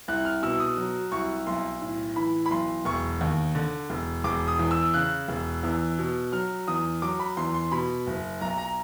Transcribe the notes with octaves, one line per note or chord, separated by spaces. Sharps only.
C2 F#6
F6
B2 E6
D#6
F#3
C2 C#6
B1 C6
A2
E3 B5
B5
B1 C6
E1 C#6
D#2
D3
E1
E1 D6
D#6
E2
E6
C#3 F#6
E1
E2
B2
F#3 F6
E2 D#6
F#3 D6
B5
E2 C6
C6
B2 B5
F#1
B1 A#5
A#5